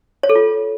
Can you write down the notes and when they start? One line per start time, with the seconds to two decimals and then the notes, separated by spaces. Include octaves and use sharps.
0.23 C#5
0.29 A4
0.35 F4